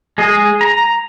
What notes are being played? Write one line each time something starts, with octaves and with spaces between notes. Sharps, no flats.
G#3 G#4 D#5
A#5